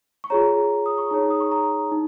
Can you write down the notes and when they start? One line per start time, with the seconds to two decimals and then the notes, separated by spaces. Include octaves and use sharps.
0.24 C#6
0.30 F4 G#4 C#5 A#5
0.86 D#6
0.98 C#6
1.10 D#4 G#4 C#5 A#5
1.30 D#6
1.40 C#6
1.51 A#5
1.92 D#4